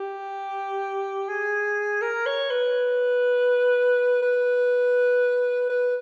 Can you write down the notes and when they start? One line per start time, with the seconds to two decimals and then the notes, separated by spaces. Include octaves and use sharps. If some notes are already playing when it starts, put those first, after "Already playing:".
Already playing: G4
1.29 G#4
2.02 A#4
2.26 C#5
2.51 B4
4.22 B4
5.69 B4